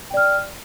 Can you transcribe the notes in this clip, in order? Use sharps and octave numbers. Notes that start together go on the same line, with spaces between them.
D5 G5 F6